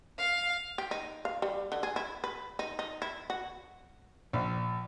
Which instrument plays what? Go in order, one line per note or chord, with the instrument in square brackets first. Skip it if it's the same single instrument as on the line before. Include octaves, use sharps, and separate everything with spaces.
[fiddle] F5
[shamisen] G4
D#4
F5
G3
D3
G#4
E4
B4
D#4
D#4
E4
F#4
[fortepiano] A#1